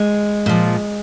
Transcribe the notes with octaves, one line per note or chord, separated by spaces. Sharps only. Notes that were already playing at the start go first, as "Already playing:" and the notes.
Already playing: G#3
A#2 F3